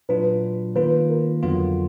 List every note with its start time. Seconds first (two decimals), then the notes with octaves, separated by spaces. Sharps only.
0.09 A#2 F#3 D4 F4 B4
0.75 D#3 A#3 F4 B4
1.09 A#4
1.43 F2 D3 F#3 B3 F4